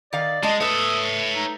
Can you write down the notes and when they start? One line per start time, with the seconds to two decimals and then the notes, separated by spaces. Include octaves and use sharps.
0.13 D#3 D5 F5
0.43 G#3 D#5 A5
0.60 A3 B4 C#5 E5 D#6
1.34 D#4